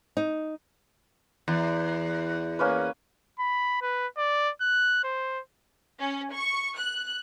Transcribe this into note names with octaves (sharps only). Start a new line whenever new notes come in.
D#4
E2
A#3 C#4 B4
B5
B4
D5
F#6
C5
C#4
C#6
F#6